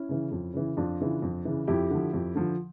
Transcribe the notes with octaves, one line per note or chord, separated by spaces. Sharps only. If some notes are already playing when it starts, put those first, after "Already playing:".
Already playing: C#4 E4
C#3 E3
F2
C#3 E3
F2 D4 F4
C#3 E3
F2
C#3 E3
F2 E4 G4
D3 F3
F2
D3 F3